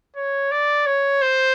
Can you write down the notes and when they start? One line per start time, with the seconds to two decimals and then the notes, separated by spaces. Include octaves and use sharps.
0.16 C#5
0.51 D5
0.86 C#5
1.22 C5